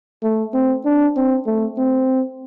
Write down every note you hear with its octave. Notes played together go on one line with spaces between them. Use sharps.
A3
C4
D4
C4
A3
C4